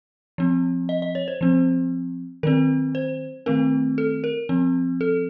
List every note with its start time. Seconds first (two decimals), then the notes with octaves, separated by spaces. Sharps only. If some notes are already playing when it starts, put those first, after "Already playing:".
0.38 F3 C4
0.89 D#5
1.02 D#5
1.15 C#5
1.28 C5
1.41 F3 C4
2.43 D#3 F#3 C4 A#4
2.95 C5
3.46 D#3 A3 C4 A#4
3.98 A4
4.24 A#4
4.49 F3 C4
5.01 A4